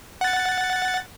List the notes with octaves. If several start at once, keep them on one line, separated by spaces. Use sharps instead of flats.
F#5 A6